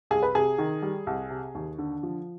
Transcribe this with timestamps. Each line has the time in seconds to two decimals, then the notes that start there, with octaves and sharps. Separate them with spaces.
0.11 C2 G#4
0.23 B4
0.35 C3 G#4
0.58 D#3
0.82 G3
1.07 C2
1.30 C3
1.55 D#2
1.78 D3
2.03 F3